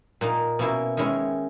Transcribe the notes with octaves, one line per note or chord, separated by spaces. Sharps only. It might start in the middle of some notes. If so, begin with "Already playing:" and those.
A#2 A#3 D#4
B2 A#3 C#4 E4
D#3 G#3 C#4 E4